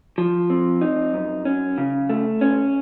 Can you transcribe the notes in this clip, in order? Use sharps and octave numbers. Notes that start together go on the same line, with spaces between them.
F3
C4
D#4
F#2
C#4
C#3
A3
C#4